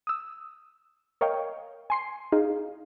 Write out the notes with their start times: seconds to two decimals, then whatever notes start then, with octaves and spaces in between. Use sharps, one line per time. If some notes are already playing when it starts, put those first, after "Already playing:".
0.07 D#6 E6
1.21 A#4 C#5 D#5 F5 G5
1.90 G#5 C6 C7
2.32 D#4 G#4 F5